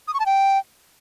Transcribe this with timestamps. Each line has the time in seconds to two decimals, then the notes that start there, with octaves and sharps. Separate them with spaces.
0.08 D#6
0.14 C#6
0.20 A5
0.26 G5